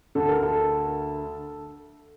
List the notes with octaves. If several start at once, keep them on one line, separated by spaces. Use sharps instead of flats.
D2 D3 A4
A#4
A4